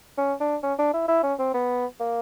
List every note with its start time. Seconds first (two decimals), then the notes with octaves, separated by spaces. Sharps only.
0.17 C#4
0.40 D4
0.63 C#4
0.78 D4
0.94 E4
1.08 E4
1.23 C#4
1.39 C4
1.54 B3
2.00 A#3